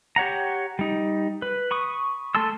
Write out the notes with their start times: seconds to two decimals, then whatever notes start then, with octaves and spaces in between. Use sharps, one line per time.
0.16 G4 C#5 F#5 A#5
0.79 G3 D#4
1.42 B4
1.71 B5 C#6 D#6
2.35 A3 A4 A5 C6 E6